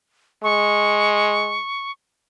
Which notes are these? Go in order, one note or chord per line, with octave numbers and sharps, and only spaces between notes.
G#3 C#6